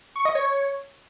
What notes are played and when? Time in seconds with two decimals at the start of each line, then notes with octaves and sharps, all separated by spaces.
0.16 C#6
0.25 D#5
0.35 C#5